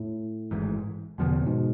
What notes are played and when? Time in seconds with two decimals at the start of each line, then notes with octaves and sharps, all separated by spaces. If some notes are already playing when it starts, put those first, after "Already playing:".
Already playing: A2
0.51 G#1 G#2 E3
1.18 E2 B2 D3 F3 B3
1.33 C3
1.46 G#2 B2